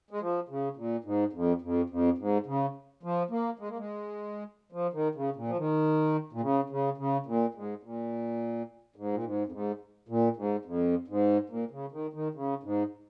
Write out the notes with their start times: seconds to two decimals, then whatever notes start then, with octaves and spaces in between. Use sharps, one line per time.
0.11 G#3
0.20 F3
0.49 C#3
0.77 A#2
1.05 G#2
1.33 F2
1.62 F2
1.90 F2
2.18 G#2
2.46 C#3
3.03 F3
3.31 A#3
3.59 G#3
3.68 A#3
3.77 G#3
4.72 F3
4.93 D#3
5.15 C#3
5.36 A#2
5.48 F3
5.57 D#3
6.33 A#2
6.41 C#3
6.70 C#3
6.97 C#3
7.26 A#2
7.54 G#2
7.83 A#2
8.96 G#2
9.13 A#2
9.23 G#2
9.47 F2
9.52 G#2
10.09 A#2
10.37 G#2
10.65 F2
11.08 G#2
11.50 A#2
11.71 C#3
11.92 D#3
12.13 D#3
12.35 C#3
12.63 G#2